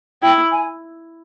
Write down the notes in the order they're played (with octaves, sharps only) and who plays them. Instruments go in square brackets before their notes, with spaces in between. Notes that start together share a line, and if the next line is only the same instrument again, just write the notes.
[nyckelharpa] E4 [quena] G5
[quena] G#5